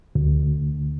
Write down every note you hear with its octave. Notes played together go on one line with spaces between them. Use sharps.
D2